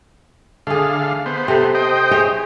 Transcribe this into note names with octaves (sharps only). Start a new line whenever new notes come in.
D3 A3 G#4 F5
B3 C5
C3 A4 E5
C5 D#5 G5
G#4 C#5 E5